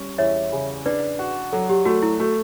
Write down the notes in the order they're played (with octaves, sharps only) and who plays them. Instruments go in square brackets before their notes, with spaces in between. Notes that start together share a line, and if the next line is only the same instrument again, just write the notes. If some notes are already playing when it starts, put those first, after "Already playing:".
Already playing: [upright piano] G3 C#4
[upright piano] E2 [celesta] C#5 E5
[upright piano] C#3
[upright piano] D4 [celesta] B4 D5
[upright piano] F#4
[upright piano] F#3 [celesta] A4
[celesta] G4
[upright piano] A3 [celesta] F#4
[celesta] E4
[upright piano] A3 [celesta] F#4